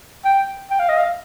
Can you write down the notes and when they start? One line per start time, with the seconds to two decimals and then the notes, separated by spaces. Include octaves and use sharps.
0.25 G5
0.71 G5
0.79 F5
0.89 D#5
0.98 F5